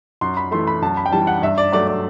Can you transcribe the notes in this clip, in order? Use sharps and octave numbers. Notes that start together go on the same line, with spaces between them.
F#2 C6
B5
E3 A3 C6
B5
F#2 A5
B5
G5
E3 G3 A5
F#5
G2 E5
D5
F#3 A3 D5
D5